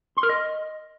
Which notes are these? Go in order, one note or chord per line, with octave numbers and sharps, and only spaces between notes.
C6
A#4
D#5